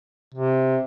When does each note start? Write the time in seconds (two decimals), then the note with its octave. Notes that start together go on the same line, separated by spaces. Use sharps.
0.34 C3